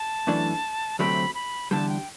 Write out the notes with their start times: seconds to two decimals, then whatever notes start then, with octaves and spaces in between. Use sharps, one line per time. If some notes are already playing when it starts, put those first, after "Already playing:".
Already playing: A5
0.27 F#2 E3 A3 D4
0.99 D2 C3 F#3 A3 C4 B5
1.35 B5
1.71 E2 D3 G3 A5
1.89 G5